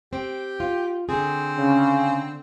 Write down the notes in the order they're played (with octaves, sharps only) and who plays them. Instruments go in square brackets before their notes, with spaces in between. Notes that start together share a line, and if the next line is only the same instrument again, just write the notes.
[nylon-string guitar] C4 [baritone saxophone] G4
[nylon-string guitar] F4
[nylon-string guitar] D3 G#4 [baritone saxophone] C4
[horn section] C#3